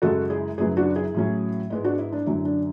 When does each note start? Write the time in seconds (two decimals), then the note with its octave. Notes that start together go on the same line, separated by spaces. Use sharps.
0.02 F#2 C#3 G#3 F#4 A4
0.30 E4 G#4
0.58 F#2 C#3 F#3 B3 E4 G#4
0.77 D4 F#4
0.96 E4 G#4
1.14 A2 F#3 C#4
1.70 G#2 G#3 B3 E4
1.84 D4 F#4
1.98 E4
2.12 D4
2.26 F#2 D3 F#3 C#4 E4
2.45 D4